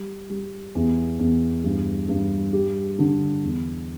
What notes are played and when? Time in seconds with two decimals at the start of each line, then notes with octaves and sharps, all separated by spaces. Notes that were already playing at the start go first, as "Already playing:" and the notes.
Already playing: G3
0.30 G3
0.75 E2
1.19 E2
1.64 G2
2.09 G2
2.53 G4
2.99 D3
3.43 E2